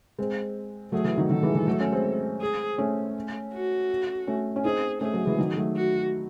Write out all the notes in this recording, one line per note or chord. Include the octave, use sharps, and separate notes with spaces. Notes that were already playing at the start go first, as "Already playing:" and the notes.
G#3 C4
F#3 A3 G#4
E3
D#3 F#3
D#3 F#3 A4
E3 G#3
E3 G#3
F#3 A3
A3 C#4
G#3 C4
G#4
A3 C#4
F#4
A3 C#4
C#4
C4 D#4 G#4
A3 C#4 G#4
F#3 A3
E3 G#3
D#3 F#3
F#3 A3
F#4